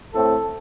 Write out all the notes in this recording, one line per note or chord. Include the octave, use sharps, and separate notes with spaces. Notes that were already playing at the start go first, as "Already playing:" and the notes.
A2 A3 C4 A4